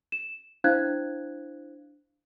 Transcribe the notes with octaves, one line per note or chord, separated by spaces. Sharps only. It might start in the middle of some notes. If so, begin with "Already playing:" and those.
E7
D4 E4 C5 F5 F#6 G#6